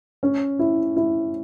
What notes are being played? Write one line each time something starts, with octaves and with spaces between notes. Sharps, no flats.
C#4
E4
E4